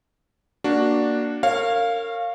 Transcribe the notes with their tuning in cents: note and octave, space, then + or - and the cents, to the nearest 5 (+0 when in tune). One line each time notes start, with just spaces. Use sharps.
A#3 +0 D4 +0 F#4 +0
A#4 -30 C#5 -20 F5 +0